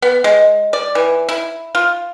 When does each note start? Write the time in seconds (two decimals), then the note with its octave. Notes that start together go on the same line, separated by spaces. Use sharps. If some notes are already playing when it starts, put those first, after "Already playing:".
0.02 B3
0.24 G#3
0.73 D5
0.95 E3
1.29 E4
1.75 F4